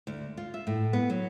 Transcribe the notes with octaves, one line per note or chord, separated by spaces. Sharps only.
D2
F4
E5
A2
B3
F#3